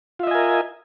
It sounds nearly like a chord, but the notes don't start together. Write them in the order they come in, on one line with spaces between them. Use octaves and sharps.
F4 E5 D#5 G#5 A#4